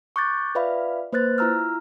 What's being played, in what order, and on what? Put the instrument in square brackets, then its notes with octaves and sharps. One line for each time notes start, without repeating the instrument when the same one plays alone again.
[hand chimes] C#6 D6 F#6 G6 A6
F4 B4 D5 E5 F5 B5
A#3 B4 C5 F#6 A6
E4 F4 A#5 E6 F6